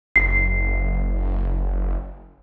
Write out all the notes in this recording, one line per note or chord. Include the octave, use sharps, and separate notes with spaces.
F#1 C7